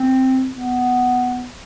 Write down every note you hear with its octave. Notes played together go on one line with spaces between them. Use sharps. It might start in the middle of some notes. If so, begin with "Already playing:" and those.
Already playing: C4
B3